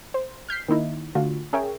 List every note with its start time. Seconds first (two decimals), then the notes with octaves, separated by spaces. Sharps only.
0.14 C5
0.49 F6 G6 B6 C7
0.68 D#3 A#3 D#4 E4
1.15 D3 A3 F4 F#4
1.53 C#4 G#4 A#4 C#5 E5 G5